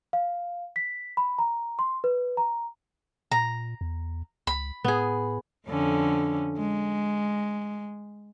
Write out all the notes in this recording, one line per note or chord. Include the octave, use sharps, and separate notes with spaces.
F5
B6
B5
A#5
C6
B4
A#5
A#2 A#5
E2
C#2 B5
A2 B3 G#4
F2 D3 C#4
G#3